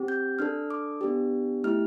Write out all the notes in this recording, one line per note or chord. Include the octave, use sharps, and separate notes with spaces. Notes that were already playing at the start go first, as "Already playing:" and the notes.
Already playing: C4 G4
G6
D4 A4 F6
D6
B3 D4 G4
A3 E4 G4 F6